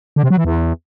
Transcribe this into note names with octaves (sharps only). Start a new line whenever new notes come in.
D3
C3
F#3
E3
E2